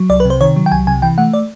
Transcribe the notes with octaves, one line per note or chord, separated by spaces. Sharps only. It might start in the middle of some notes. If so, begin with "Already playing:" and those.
Already playing: F#3
C2 D5
B4
C3
C5
D#3 C#5
F#3
G5
C2 G#5
C3 G#5
E3 G5
A3 F#5
D5